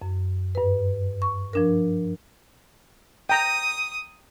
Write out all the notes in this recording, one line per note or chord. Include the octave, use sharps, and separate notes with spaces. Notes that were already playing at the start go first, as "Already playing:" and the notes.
F#2
G2 B4
C#6
F3 D4 A#4
G5 A#5 D#6